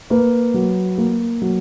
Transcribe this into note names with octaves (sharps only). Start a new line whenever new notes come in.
A#3 B4
F#3
A#3
F#3